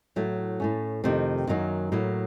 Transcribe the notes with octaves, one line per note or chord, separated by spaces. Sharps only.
A2 F#3 A3
A2 A3 C#4
F2 C3 D#3 A3 C4
F#2 D#3 F#3 A#3
A2 F#3 A#3